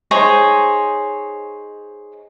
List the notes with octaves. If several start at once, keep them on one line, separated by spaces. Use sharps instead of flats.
D#4 G#4 C5 C#5